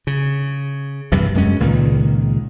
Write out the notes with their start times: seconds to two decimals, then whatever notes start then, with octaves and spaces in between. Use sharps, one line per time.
0.07 C#3
1.12 E2 G2 C3
1.35 F#2 G#3 C#4
1.60 C#2 A#2 D#3